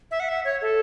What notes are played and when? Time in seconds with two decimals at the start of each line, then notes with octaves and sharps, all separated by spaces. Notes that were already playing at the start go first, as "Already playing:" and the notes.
0.11 E5
0.20 F#5
0.29 E5
0.45 C#5
0.62 A4